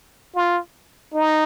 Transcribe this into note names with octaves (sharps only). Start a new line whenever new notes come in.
F4
D#4